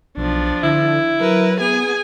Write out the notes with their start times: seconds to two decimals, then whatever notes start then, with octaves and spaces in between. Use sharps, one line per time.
0.17 B1 F3 D4
0.64 D3 E4
1.20 F#3 A#4 B4
1.61 B3 G#4 G#5